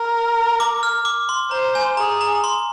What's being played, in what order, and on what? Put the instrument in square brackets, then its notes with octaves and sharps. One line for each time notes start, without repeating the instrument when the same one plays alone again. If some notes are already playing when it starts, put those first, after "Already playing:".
Already playing: [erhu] A#4
[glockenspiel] D6
F6
D6
C6
[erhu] C5 [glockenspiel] A#5
[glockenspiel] G#5
[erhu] G#4 [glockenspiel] A#5
[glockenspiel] A#5
C6